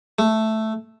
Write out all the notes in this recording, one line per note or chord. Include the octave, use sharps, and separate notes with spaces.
A3